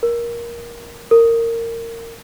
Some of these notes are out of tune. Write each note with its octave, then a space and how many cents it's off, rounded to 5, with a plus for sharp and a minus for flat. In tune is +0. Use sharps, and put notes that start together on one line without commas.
A#4 +15
A#4 -20